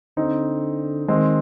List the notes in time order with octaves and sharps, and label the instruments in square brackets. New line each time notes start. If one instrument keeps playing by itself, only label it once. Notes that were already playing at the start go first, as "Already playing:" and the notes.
[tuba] D3 [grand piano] C4 D#4
[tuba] D#3 [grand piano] G#3 C4